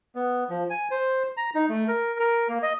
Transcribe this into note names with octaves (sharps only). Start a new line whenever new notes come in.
B3
F3
G#5
C5
A#5
D#4
A3
A#4
A#4
A#3
D#5